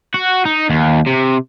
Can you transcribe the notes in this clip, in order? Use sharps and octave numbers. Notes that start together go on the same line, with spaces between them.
F#4
D#4
D#2
C3